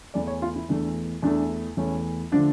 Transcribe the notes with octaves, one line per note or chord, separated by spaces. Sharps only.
E2 E3 A3 D5
C#5
F4
E4
E2 E3 A3 D4
E2 E3 A3 D4
E2 E3 A3 C#4
D3 F3 A3 D4